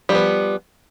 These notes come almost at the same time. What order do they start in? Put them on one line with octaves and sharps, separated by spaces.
G3 F3 B3